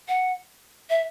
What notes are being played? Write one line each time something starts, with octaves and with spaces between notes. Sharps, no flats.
F#5
E5